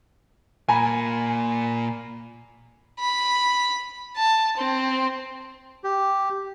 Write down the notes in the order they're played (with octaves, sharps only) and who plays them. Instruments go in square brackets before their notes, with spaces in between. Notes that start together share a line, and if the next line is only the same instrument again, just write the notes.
[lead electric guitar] A#2 A#3 [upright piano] G#5 A#5 B5
[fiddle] B5
A5
C4
[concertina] G4